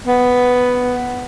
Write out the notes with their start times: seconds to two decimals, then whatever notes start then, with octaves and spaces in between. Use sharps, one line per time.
0.07 B3